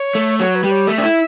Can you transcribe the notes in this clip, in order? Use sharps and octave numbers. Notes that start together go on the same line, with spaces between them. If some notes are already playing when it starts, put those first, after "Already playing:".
Already playing: C#5
A3
F#3 C#5
B4
G3
C#5
A3 E5
D4
E4